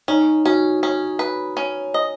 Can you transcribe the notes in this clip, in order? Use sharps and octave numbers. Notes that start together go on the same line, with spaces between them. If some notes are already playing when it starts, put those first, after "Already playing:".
C#4 D#4
C#4 F#4
C#4
B4
C#4
D#5